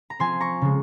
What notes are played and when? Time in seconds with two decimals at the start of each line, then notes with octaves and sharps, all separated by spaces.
0.10 A#5
0.19 F3 C4 G#5 C6
0.40 A#5 C#6
0.61 C#3 F3 G#3